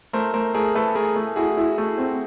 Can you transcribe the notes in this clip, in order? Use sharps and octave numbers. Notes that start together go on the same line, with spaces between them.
A3 A#4 C5
A3 A#4 C5
A3 G#4 A#4
A3 A4 B4
A3 G#4 A#4
A3
E4 F#4 G#4
E4
A3
C4